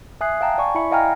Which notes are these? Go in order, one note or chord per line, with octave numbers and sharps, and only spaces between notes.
E5 G#5 D#6 F#6 C7
F5 G5 A5 A#5
D5 G#5 C#6
E4 D5 E5 B5 C#7
D#5 F5 G5 G#5 A#5 F6